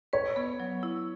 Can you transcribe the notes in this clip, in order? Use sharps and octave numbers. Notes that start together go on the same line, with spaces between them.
B4 C#5
B3
F#3
E4